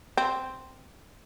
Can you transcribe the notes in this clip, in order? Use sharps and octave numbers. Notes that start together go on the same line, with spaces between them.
C4